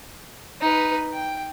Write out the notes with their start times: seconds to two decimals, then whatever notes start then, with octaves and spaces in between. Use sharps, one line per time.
0.61 D#4 B4
1.13 G5